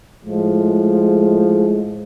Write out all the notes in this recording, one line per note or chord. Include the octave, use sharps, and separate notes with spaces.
A2 F3 G#3